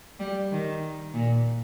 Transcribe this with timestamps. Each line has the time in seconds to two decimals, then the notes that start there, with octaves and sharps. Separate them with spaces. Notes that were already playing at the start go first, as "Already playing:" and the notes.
0.20 G3
0.52 D#3
1.13 A#2